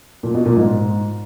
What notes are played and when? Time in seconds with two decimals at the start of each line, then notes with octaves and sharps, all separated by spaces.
0.23 A#2
0.34 B2
0.45 A#2
0.56 G#2